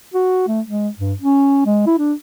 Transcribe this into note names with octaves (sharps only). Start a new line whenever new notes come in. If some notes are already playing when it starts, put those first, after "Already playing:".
F#4
A3
G#3
G2
C#4
G#3
E4
D4